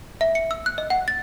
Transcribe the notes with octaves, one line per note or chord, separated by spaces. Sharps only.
E5
C#7
E6
F#6
D#5
F#5
A6